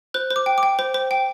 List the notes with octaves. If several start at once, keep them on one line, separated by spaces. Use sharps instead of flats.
C5 F#6
C5
D6
G5
D6
G5
C5
C5
G5